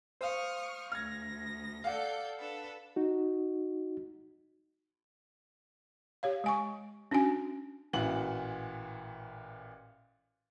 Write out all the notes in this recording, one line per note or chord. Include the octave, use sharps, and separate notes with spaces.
C5 F5 C#6 D#6 F6
D2 F6 G#6 A#6
A4 D5 F5 F#5 G6
D4 A4 B4
D#4 F#4
G4 C#5 F5
G#3 G#5 C#6
C#4 D4 F#4 G#5
A1 A#2 E3 F#4 F#7